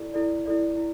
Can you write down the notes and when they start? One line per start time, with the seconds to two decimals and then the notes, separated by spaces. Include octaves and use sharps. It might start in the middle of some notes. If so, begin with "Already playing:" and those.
Already playing: E4 A4 D5
0.14 E4 A4 D5
0.46 E4 A4 D5
0.77 E4